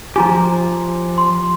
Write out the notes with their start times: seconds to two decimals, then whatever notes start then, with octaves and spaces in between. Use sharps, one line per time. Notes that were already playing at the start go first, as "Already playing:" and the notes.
0.16 F3 F4 G4 G#5 A#5
1.18 C6